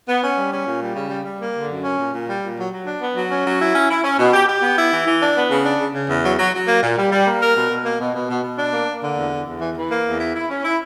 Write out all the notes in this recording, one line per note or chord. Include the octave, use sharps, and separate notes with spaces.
B3
C#4
G3
C#4
A#2
G3
C#3
G3
G3
A#3
D3
F#2
C#4
A#2
A#2
G3
A#2
F#3
F#3
D4
B3
F#3
C#4
F#3
E4
C#4
E4
C#4
B2
G4
G4
B3
E4
E3
E3
D4
B3
C#3
D4
C#3
C#3
E2
F#3
F#3
F#3
A#3
A#2
G3
G3
A#3
A#4
B2
B2
A#3
B2
B2
B2
B2
D4
A#3
A#3
D3
E2
E2
E2
E3
E3
A#3
E2
E4
E4
C#4
E4